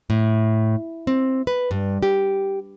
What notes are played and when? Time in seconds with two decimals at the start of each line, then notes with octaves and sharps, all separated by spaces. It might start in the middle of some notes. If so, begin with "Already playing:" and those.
0.10 A2
1.07 C4
1.47 B4
1.71 G2
2.03 G4